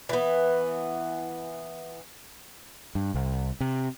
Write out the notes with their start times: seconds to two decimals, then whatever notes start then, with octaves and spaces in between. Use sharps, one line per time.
0.09 E3 B3
2.95 G2
3.14 C2
3.61 C3